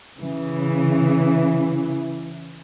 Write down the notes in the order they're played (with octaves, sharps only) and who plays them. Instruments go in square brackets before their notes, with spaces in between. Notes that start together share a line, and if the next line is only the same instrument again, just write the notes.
[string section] C#3 E3